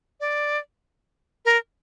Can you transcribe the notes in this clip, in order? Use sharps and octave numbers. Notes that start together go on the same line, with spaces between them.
D5
A#4